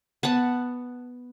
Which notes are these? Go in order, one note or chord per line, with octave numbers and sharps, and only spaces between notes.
B3 F#5 A5